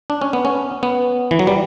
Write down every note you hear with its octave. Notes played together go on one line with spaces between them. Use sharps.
D4
C#4
B3
C#4
B3
E3
F#3
G3